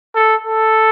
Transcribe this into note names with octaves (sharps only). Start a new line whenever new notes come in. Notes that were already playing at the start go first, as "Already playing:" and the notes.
A4
A4